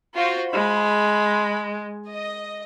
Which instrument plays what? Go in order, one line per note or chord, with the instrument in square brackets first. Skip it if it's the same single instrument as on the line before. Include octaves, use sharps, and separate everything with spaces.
[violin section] F4 F#4 C5
[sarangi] G#3 [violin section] B5
[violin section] D#5